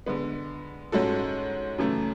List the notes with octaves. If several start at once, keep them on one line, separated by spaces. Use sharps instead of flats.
D3 G#3 B3
G#2 G#3 C#4 F#4 A4
F#2 C#3 E3 A3